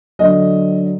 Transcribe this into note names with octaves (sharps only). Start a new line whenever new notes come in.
D3 F#3 D#5